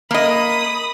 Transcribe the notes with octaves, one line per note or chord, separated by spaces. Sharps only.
A#3 D#5 B5 D#6